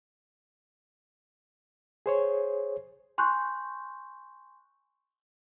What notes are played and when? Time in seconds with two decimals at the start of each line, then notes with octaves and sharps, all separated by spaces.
2.06 G#4 C5 C#5
3.18 G#5 C6 C#6 F#6 G6